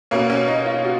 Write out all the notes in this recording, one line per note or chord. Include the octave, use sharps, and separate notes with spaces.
B2 A#3 C#4
C#4
D#4
F4
F#4